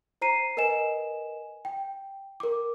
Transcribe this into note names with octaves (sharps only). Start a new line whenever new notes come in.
C5 A#5 C7 D#7
A#4 B4 D#5 G#5 E7
G5
A#4 D6